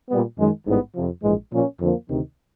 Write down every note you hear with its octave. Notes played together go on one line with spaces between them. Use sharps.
A#2 G3 B3
F#2 D#3 G#3
A1 G#2 E3 G3 B3
F2 C3 F3
A#1 G#2 E3 G#3
A#2 F3 A#3 C#4
F2 D3 F3 A#3
D2 C3 D#3